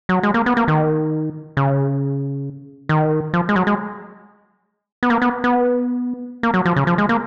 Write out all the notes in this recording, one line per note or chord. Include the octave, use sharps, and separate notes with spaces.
F#3
G#3
A#3
B3
A#3
D#3
C#3
D#3
F3
G#3
F#3
G#3
B3
A#3
B3
B3
A#3
F#3
F3
C#3
F3
G#3
A#3